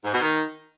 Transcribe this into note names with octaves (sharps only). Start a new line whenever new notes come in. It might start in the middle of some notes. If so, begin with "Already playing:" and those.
G#2
B2
D#3